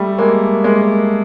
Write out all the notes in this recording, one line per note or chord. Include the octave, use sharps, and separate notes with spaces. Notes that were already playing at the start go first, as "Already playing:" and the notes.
Already playing: G3 A3
G#3 A#3
G#3 A#3